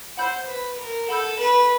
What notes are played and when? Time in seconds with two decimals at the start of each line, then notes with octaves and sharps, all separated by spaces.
0.17 C5 F#5 B5 E6 G6
0.48 B4
0.78 A#4
1.08 A4 F#5 B5 E6 G6
1.39 B4